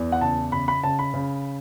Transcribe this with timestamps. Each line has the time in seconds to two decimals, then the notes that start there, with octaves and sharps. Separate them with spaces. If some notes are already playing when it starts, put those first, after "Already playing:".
Already playing: E2 E3
0.12 F#5
0.21 C#3 A5
0.52 C#3 B5
0.68 B5
0.84 C#3 A5
0.99 B5
1.14 C#3